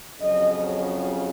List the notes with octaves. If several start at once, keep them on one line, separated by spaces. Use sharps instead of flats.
F2 C#3 F#3 D#5